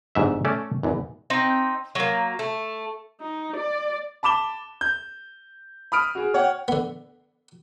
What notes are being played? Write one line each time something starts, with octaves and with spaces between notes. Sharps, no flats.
G1 G#2 E5
A3 C#4 A4 D5
G#1 E2
C4 D#4 G5
F#3 A#3
A3
D#4
D5
A5 B5 D6 E7 G7
G6
B5 D#6 F6 D7
F#4 G#4
C#5 F#5 G5
D3 B3